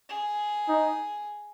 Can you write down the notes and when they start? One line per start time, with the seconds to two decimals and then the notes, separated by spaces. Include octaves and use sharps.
0.09 G#4
0.69 D#4